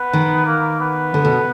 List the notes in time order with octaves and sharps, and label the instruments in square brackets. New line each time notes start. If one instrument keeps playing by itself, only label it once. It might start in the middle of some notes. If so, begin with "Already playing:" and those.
Already playing: [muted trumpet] B3
[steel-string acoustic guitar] D#3
[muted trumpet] A#3
B3
[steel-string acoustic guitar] D3
B2